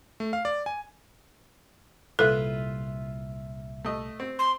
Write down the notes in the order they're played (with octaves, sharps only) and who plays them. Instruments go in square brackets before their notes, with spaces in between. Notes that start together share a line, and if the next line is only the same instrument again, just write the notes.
[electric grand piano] A3
F5
D5
G#5
[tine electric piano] C2 A#2 E5 [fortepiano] E4 F4 B4 [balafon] A4
[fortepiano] A3 D#5
C4
[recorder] C6